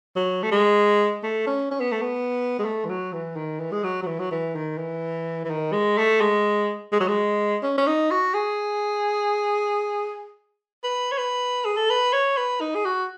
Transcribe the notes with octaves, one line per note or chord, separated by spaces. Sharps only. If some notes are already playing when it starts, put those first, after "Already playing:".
F#3
A3
G#3
A3
C#4
C#4
B3
A3
B3
G#3
A3
E3
F#3
E3
D#3
E3
G#3
F#3
F#3
E3
F#3
E3
D#3
E3
E3
D#3
G#3
A3
G#3
G#3
F#3
G#3
C#4
C#4
D#4
F#4
G#4
B4
C#5
B4
G#4
A4
B4
C#5
B4
D#4
G#4
F#4